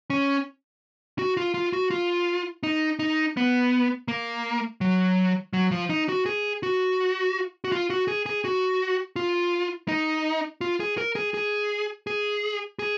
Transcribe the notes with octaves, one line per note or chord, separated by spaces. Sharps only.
C#4
F#4
F4
F4
F#4
F4
D#4
D#4
B3
A#3
F#3
F#3
F3
D#4
F#4
G#4
F#4
F#4
F4
F#4
G#4
G#4
F#4
F4
D#4
F4
G#4
A#4
G#4
G#4
G#4
G#4